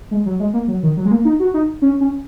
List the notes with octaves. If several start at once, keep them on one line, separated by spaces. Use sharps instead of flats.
G#3
F#3
G#3
A#3
F#3
D#3
F#3
G#3
A#3
D#4
F#4
D#4
C#4
C#4